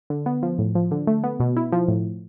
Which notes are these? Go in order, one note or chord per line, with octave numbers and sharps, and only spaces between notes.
D3
B3
F3
A2
F3
D3
A3
B3
B2
E4
F3
A2